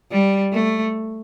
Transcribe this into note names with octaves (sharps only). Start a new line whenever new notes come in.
G3
A3